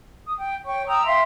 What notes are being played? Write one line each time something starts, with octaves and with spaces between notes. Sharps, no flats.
D#6
G5
C#5 G5 C#6
G5 A#5 D#6 E6
E5 F5 G5 C6